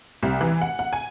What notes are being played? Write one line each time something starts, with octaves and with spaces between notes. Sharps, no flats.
C2
E3
F#5
F#5
G#5